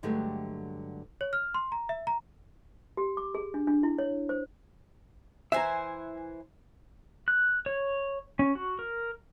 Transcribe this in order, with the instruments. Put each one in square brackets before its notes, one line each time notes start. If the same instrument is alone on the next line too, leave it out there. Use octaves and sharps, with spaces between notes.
[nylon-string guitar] G2 D3 F#3 G#3 A3 G4
[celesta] C#5
F6
C6
A#5
E5
A#5
[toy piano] G4
D6
G#4
D4
D4
E4
C#5
C5
[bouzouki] E3 C5 G#5 [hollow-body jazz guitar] E5 A#5
[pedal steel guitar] F#6
C#5
C#4
F#4
A#4